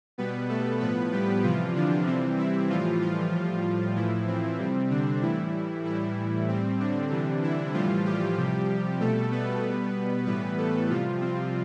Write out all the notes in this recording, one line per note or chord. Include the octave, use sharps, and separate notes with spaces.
B2 G3 B3 B4
A3 A4
A2 F3 B3 B4
G3 G4
C3 E3 F3 G3 F4
D3 D4
C3 E3 G3 C4
E3 E4
A2 E3 F3 G3 F4
F3 F4
A2 G3
A2 E3 F3 E4
C4
C3 G3
D3 D4
A2 E3 G3 E4
A2 E3 G3 E4
A2 G3 C4
D3 D4
C3 E3 G3
E3 E4
A2 E3 F3 G3 F4
G3 G4
C3 F3
B2 G3 A3 A4
B3 B4
B2 G3
A2 E3 G3 B3 B4
A3 A4
C3 F3 G3 F4
C4